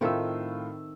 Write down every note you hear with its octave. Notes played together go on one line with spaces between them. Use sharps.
A2 D#3 A3 C4 F4 E6